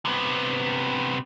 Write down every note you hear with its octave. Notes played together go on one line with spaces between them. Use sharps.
C3 B3